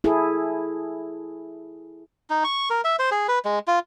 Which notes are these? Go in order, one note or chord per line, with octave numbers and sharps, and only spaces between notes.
E4 G#4 A4
D#4
C#6
A#4
E5
C5
G#4
B4
G#3
F4